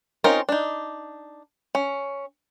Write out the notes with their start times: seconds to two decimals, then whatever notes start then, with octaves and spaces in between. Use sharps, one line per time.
0.24 C4 C#4 D#4 F4 A#4
0.49 D4 D#4
1.75 C#4